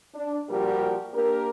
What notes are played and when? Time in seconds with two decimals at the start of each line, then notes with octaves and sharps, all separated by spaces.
0.14 D4
0.49 A#2 F3 G3 F#4 G4 A#4
1.13 A#3 D4 G4 A#4